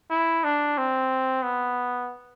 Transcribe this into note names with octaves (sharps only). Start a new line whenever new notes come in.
E4
D4
C4
B3